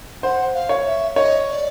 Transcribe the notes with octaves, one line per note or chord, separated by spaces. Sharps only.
C5 F#5
F5
C#5
E5
C#5 D#5
D#5
D5